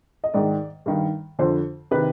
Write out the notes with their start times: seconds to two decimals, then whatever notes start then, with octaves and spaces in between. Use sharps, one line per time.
0.24 D#5
0.34 G#2 D#3 D5
0.86 G2 D#3
1.39 F2 D3 C5
1.91 C3 D#3 B4